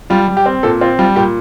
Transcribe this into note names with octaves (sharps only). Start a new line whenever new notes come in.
G3 F4
G3
G4
C4
A#2 A4
C4 F4
G3 F4
A#2 G4